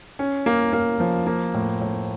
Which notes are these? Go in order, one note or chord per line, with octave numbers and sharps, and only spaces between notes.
C#4
A#3
A#3
F3
A#3
A2
A2